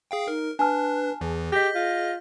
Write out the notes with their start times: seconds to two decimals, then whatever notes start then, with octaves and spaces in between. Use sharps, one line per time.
0.11 G#4 F5 G5
0.28 D#4 A#4
0.59 D4 B4 G#5 A5 F6
1.21 E2 E3 G#4
1.52 G4 D#5 G6 A#6 B6
1.75 F4